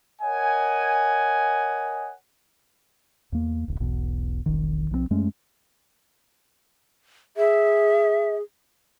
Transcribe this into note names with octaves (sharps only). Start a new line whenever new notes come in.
A#4 C#5 D#5 F#5 G#5
E2 A#3
D1 B1
E1 B1 B2
E1 B1 D#3
B1 F3 F#3 C4
F#2 G#3 A3 C#4
G#4 E5